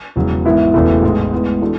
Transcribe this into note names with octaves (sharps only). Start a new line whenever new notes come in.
E1 E2 C#3 F#3
G#1 G#2 E3 B3 E4
E1 E2 C#3 E3 A3
A1 G#2 G#3
A2 G#3 B3
E3 A3 D4 F#4